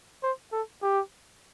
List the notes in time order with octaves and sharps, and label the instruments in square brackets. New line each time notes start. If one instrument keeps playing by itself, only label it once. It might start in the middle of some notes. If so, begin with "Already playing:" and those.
[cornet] C5
A4
G4